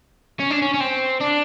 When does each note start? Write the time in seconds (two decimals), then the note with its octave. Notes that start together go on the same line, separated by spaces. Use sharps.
0.40 C#4
0.50 D4
0.62 C#4
0.74 C#4
0.80 C4
1.21 D4